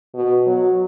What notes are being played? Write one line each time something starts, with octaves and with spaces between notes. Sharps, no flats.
B2
F#3